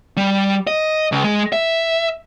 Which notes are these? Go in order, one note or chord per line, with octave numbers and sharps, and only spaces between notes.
G3
D#5
C#2
G#3
E5